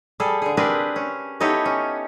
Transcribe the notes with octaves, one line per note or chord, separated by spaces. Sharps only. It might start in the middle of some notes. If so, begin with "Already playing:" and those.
G3 G#4 A4
D3 G#4
C4 D4 G4 G#4 A#4 B4
C#4
B3 D#4 E4 G4 A4 C#5
C#4